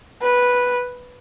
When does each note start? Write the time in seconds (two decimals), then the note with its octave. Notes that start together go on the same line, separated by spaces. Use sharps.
0.22 B4